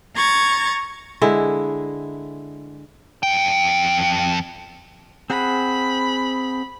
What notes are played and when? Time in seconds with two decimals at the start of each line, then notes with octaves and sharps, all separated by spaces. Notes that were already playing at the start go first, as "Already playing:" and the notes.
0.16 A#5 C#6 G#6 A6
1.22 D3 G#3 E4
3.23 F2 G5
5.30 C4 G#4 F#5 B5